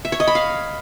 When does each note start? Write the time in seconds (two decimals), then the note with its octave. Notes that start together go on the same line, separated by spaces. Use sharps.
0.05 E5
0.12 C#5
0.20 D#5
0.27 B5
0.35 F5